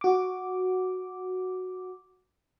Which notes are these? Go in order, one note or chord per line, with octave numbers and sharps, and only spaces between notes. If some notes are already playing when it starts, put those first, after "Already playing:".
F#4 D6